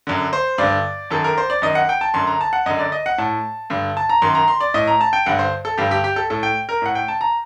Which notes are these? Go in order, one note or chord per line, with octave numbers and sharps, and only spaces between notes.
F#2 D3
C5
G2 D3 D5
F#2 D#3 A4
A#4
C5
D5
F#2 D#3 D#5
F#5
G5
A5
F#2 D3 C6
A#5
A5
F#5
F#2 D3 D#5
D5
D#5
F#5
A2 A5
G2 D3
A5
A#5
F#2 D#3 C6
A#5
C6
D5
A2 D#5
A#5
A5
G5
G2 D3 F#5
C5
A4
G2 D3 G4
G4
G4
A4
A2 A4
G5
A#4
A2 F#5
G5
A5
A#5